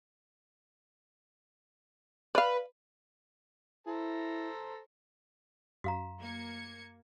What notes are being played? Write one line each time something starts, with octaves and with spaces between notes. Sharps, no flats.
B4 D5 F5
E4 A4 C5 A#5
F#2 F#4 F5 A#5
A#3 G#6 C#7